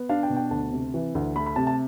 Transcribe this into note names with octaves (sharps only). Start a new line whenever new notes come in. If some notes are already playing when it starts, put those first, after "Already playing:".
Already playing: B3
D4 F5
G5
B2
G5
D2 A5
C3
E3
D2
A3 B5
B5
C3 A5
A5